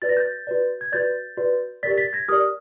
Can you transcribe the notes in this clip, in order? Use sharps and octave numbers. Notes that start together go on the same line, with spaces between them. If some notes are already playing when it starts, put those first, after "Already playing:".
F#4 B4 D5 A6
A#6
G6 A6
F#4 B4 D5
G#6
F#4 B4 D5 G6 A6
F#4 B4 D5
G4 A#4 D5 A6 B6
A6 B6
G#6 A#6
G4 A#4 D5 D#6 F6